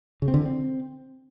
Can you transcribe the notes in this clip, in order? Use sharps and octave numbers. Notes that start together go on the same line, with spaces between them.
C#3
C4
D3
E3
C4